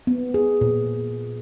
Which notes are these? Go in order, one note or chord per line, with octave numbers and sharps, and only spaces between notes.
B3
G#4
A#2